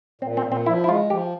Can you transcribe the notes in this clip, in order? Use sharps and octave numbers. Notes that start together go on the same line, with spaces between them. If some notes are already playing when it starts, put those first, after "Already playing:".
A#2 C4
C4
A#2
C4
F3 E4
E4
G#3 F4
F3 G4